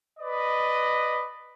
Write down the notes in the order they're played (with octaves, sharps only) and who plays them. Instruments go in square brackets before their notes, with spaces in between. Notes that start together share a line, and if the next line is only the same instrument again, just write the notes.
[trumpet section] B4 D5 D#5